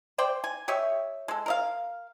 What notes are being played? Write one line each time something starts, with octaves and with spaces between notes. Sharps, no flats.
C5 D5 G5
G#5
G4 C#5 D#5 E5
G#3 A4
A#4 D#5 F5